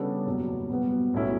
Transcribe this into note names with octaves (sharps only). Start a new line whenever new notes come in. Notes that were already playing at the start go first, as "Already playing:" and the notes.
Already playing: C#3 G3 B3 D4 A4
F#1 E2 B2 F#3
B2 G3 B3
B1 A2 F#3 C#4 E4